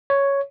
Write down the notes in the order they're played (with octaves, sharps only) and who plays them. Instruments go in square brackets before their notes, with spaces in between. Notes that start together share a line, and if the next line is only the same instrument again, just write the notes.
[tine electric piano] C#5